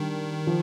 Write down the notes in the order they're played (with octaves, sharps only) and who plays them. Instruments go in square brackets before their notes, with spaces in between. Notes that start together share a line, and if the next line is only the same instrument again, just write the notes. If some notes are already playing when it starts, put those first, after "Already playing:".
Already playing: [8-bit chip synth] D#3 [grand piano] G3 D4
[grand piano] F3